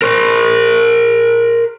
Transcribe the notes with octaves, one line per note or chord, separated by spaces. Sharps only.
A#4 C5